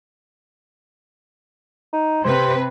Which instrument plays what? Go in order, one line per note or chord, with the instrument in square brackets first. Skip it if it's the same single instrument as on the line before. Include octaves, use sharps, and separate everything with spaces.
[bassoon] D#4
[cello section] C3 B4 [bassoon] C5